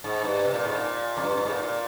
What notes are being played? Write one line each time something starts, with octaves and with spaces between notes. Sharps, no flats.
G#2
G2
C3
A#2
G#2
A#2
F2
G2
G2
G#2
A#2
A#2